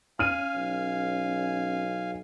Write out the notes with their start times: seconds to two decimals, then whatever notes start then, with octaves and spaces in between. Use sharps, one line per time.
0.19 C#4 F5 G#5 F6 D#7
0.56 B1